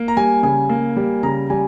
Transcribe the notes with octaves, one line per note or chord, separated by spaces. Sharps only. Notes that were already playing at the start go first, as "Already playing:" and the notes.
Already playing: A#3
A#5
G3 G#5
C#3 G#5
A#3
G3
C#3 A#5
G3 G#5